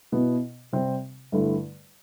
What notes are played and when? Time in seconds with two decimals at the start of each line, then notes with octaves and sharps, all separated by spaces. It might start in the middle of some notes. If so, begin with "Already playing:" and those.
0.12 B2 B3 E4
0.73 C3 G3 C4
1.32 G2 D3 A3 E4